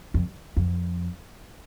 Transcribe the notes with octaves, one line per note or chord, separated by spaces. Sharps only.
F2
F2